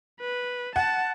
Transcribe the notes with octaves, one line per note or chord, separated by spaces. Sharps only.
B4
F#5 A5